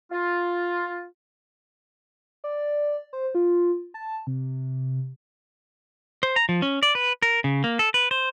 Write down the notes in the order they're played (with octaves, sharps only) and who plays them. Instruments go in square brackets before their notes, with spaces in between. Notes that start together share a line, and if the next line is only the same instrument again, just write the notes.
[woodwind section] F4
[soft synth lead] D5
C5
F4
A5
C3
[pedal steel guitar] C5
A#5
F3
C#4
D5
B4
A#4
C#3
A#3
A4
B4
C5